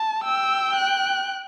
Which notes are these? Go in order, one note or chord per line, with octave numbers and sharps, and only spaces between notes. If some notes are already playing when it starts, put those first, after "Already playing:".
Already playing: A5
G5 E6
F#6